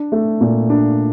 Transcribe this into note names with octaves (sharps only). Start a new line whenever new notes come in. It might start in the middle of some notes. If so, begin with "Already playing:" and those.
Already playing: D4
A3
A#2
D4